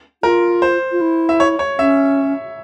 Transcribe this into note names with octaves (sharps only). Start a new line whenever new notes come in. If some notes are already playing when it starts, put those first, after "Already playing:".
F4 A#4
C5
F4
E4
E5
C#5
C#5
C#4 E5